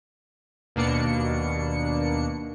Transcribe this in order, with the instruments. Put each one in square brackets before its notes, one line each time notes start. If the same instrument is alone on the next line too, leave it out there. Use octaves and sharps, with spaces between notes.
[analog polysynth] D#2 B2 A#3 D4 C#7